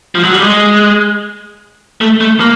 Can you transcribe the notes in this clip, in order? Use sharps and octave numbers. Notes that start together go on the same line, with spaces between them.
F3
F#3
G3
G#3
A3
A3
A#3